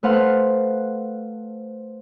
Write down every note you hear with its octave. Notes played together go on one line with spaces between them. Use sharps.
A3 B4 C5 F5 F#5